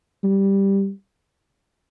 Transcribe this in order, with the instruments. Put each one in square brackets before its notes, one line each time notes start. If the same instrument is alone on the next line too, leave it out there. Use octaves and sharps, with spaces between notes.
[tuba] G3